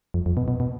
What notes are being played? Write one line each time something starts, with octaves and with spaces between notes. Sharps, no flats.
F2
F2
B2
B2
B2